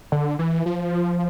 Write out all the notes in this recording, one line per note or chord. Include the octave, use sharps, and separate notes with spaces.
D3
E3
F3